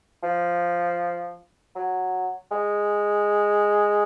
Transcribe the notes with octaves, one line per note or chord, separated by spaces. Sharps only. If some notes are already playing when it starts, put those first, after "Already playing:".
F3
F#3
G#3